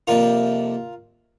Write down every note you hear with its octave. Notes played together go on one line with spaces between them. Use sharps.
F2 C3 A#3 D4 F4 A#4